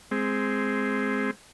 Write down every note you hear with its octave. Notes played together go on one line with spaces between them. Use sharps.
G#3 C4